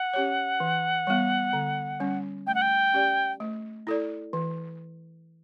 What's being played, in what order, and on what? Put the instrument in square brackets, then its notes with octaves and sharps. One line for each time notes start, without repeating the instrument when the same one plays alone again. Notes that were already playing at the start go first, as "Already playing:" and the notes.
Already playing: [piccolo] F#5
[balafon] C#4 G4 C#5
E3
G3 B3
D3
G3 C#4
[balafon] A3 [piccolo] G5
[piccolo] F#5
G5
[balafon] C#4 G4 D5
A3
E4 A4 D5
E3